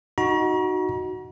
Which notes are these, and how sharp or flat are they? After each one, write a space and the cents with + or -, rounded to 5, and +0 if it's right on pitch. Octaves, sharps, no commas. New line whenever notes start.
D#4 +0 F#4 +0 A#5 +40